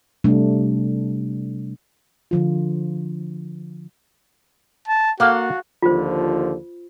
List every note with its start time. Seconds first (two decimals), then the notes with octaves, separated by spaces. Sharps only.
0.24 C3 G3 A3 D4
2.31 D3 F3 F4
4.88 A5
5.20 A#3 F#4 A4 F5 F#5
5.82 D#2 D3 F3 F4 C5